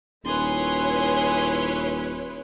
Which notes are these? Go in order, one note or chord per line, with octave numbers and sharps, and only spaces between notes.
D#1 E4 G#4 B4 C#5 C6